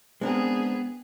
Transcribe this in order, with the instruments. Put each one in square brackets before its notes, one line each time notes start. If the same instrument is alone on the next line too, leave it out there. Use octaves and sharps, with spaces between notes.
[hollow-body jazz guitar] G#3 D4 A#4 [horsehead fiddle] B3 G#4 [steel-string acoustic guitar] C4